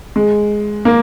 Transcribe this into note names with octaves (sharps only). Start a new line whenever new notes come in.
G#3
A#3